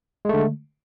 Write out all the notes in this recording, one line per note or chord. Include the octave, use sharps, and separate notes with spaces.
D3 G#3 A3